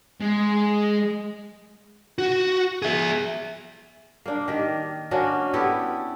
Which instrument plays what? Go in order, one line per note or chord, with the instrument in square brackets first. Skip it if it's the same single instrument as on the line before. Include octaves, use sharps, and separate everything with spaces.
[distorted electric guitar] G#3
[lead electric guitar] F#4
G#4 E5
[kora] A#3 D4
D#3 G4
A#3 C#4 D4 F#4
B3 E4 G4 A4